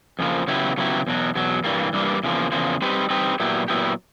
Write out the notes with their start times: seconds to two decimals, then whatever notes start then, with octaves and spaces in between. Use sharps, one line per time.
0.19 F2 C#3 F3 A#3
0.48 C#3 F#3 B3 E4 G4
0.77 C#3 F#3 B3 E4 G4
1.07 E2 B2 F#3
1.35 E2 B2 F#3
1.64 G2 E3 G3 A#3
1.93 G2 E3 G3 A#3
2.23 E2 C#3 F3 A#3
2.52 E2 C#3 F3 A#3
2.82 G3 C4 D#4 G4 B4
3.10 G3 C4 D#4 G4 B4
3.40 A#2 F#3 B3 E4 G4
3.68 A#2 F#3 B3 E4 G4